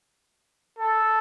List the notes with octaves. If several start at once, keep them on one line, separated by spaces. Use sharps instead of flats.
A4